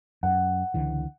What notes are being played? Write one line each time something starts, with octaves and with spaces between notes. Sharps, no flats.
F#2 F#5
C#2 D3 E3